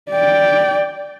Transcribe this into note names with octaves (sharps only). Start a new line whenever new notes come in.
D5 G5